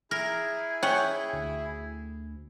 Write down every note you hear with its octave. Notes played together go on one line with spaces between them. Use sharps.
E4 G#4 A#4
C#4 F#5 G5 C#6
D2